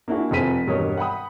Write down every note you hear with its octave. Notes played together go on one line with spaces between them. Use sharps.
A#3 D4 E4 F#4 G#4
F1 F2 G#4 C5 B6 D#7
E1 G2 A#4 C#5 D#5 D#6
F#5 G5 B5 D#6